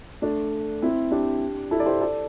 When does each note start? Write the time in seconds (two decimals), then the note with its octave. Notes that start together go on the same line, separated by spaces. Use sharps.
0.22 A3 D4
0.82 C4 E4
1.11 D4 G4
1.71 E4 A4
1.80 D5
1.86 G4 C5
2.01 A4 D5